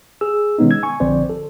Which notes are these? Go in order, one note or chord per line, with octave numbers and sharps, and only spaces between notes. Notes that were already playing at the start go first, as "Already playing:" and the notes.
G#4 E6
B2 D#3 G#3 B3 C#4 D#4
E6 G#6
G#5 C#6
A#1 D3 F3 C4 C5 D5
A4